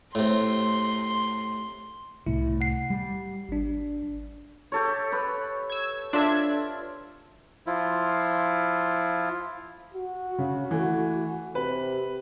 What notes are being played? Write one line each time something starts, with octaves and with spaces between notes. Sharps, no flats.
A2 C3 C6
C2 A2 E4
F#5 C7
G3
G#1 D4
G4 A4 C#5
B4 C#5
E6 G#6
D4 F4 A4 E5 G#6
F3 E4 F4
F#4
C#3
E3 A3
C3 B4